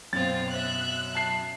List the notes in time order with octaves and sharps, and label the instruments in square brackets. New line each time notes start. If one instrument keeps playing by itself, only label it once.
[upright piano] F#2 B2 [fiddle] C4 F4 [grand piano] A6
[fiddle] E5 F#6
[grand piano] A5 C7